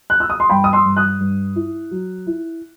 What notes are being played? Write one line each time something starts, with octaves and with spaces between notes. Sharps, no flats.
F#6
E6
D#6
C6
G2 G5 B5
D#6
C6 E6
G2
D#6 F#6
G2
E4
F#3
E4